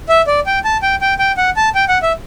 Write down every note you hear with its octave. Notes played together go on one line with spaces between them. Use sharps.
E5
D5
G5
A5
G5
G5
G5
F#5
A5
G5
F#5
E5